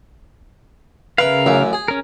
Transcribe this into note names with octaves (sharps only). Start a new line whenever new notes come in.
C#3 A#4 B4 E5 F5
A1 F#2 E5
G#4
C#4 A#4